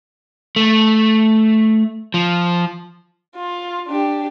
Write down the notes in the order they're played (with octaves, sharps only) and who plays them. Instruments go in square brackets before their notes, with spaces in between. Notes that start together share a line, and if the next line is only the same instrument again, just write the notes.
[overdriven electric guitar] A3
F3
[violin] F4
D4 G4